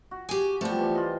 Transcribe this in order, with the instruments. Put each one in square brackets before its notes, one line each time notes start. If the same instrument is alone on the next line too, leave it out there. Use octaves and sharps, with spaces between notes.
[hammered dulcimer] F#4
[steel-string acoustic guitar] G4 G#5 [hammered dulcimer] G#4
[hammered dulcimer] C3 F3 G3 [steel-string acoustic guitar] A3 B3
[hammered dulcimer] E3 G3
F4 D#5